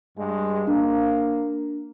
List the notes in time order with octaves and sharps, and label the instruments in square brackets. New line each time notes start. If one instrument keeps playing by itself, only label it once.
[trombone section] G2 G#3
[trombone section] A#3 [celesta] D4